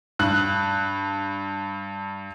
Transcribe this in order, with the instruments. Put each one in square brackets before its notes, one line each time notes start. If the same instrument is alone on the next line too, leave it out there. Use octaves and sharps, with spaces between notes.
[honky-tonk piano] G2 F#6